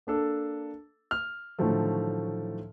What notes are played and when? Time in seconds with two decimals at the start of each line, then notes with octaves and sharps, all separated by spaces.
0.07 A#3 D4 A4
1.11 F6
1.59 A2 D3 D#3 F3 F#3 A3